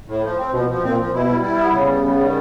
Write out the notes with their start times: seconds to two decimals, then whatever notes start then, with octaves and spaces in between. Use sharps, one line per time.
0.08 A2
0.23 F3
0.38 C4
0.53 B2 F3
0.69 F3
0.83 A#2 C4
0.98 F3
1.13 B2 E4
1.29 G3
1.43 E4
1.58 B3
1.73 C#3 G3
1.90 B3
2.04 G3
2.19 D#3